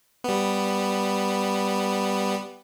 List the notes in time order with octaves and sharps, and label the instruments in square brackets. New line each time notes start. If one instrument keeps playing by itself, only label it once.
[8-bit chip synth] G3 B3